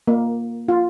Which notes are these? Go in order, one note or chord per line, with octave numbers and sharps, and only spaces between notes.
A#3
F4